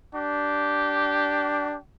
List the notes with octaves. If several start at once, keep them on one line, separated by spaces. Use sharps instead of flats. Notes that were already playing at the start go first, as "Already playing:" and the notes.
D4 G4